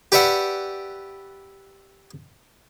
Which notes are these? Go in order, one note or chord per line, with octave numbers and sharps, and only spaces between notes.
G4 B4 D5 E5 F#5